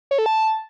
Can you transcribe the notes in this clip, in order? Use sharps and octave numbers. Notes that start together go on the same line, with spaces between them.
C#5
A4
A5